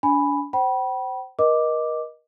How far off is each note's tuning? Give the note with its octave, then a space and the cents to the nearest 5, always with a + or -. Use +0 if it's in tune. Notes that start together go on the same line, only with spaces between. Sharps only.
D4 -35 G#5 +0 B5 +0
C5 +0 G5 -40 B5 -25
A#4 +40 D#5 +0 D6 +0